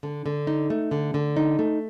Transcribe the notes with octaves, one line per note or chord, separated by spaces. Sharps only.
D3
D3
D#4
A3
D3
D3
D#4
A3